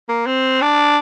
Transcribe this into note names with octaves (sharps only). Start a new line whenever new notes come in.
A#3
C4
D4